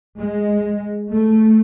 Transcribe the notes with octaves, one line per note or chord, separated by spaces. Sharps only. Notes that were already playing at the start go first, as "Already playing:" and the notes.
G#3
A3